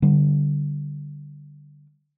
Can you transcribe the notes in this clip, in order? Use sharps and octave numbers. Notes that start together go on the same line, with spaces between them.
D3 G3